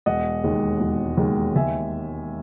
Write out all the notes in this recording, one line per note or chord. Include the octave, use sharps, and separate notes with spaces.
E1 D#5 F#5
D#2 D#3 G#3
E1
D#2 D#3 G#3
D#2 E5 G#5